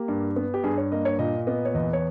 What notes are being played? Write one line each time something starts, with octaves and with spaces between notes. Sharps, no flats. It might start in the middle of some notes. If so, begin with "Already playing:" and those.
Already playing: A#3 G4
G2
B3
G4
G2 G#4
C#5
A#3 D#5
C#5
A#2 D#5
B3 D#5
C#5
E2 D#5
C#5